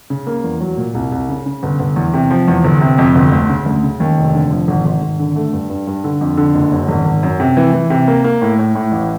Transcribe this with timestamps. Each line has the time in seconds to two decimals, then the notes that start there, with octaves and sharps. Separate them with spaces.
0.10 C#3
0.27 A#3
0.44 E2
0.61 F#3
0.77 A#2
0.95 C2
1.12 C2
1.29 C#3
1.46 C#3
1.63 G1
1.80 G1
1.96 E2
2.14 C3
2.30 F3
2.48 E2
2.64 G1
2.81 C3
2.98 F2
3.15 G1
3.32 D2
3.49 C#3
3.66 D2
3.83 C#3
4.00 D#2
4.17 F1
4.34 D3
4.51 F3
4.68 G#1
4.85 G#1
5.02 G#1
5.19 D3
5.36 A3
5.53 G2
5.70 G2
5.87 G2
6.04 D3
6.21 F2
6.37 D3
6.55 F#1
6.72 F#2
6.89 G#1
7.05 G#1
7.23 F#2
7.40 C3
7.57 E3
7.73 E3
7.90 C3
8.08 A#3
8.24 A#3
8.42 A2
8.59 A2
8.75 A2
8.92 A1